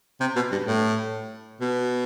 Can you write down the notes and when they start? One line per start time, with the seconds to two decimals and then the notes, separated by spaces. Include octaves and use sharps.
0.20 C3
0.36 B2
0.51 G2
0.66 A2
1.60 B2